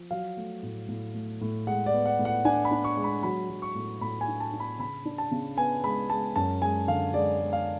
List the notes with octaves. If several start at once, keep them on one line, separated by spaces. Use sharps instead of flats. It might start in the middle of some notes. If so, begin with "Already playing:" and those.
Already playing: F3
F#3 F5
A3
A2
A2
A3
A2
G#3 F#5
D5
B3
F#5
A2
F#5
D4 G#5
B5
D4
C#6
G#3
B5
F#3 B5
F#3
C#6
A2
A2 B5
G#5
D4
A5
D4
B5
C#3 B5
D4
A5
C#3
B3 G#5
G#3 B5
G#3 A5
F#2 A5
G#3 G#5
D3 F5
G#3 D5
G#3
F5